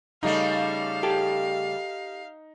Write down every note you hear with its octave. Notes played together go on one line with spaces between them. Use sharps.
C#3 G3 A3 D#4 F5
G4 A4